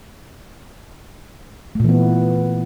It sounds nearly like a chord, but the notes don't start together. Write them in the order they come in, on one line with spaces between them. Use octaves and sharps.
A3 A#2 E3 B3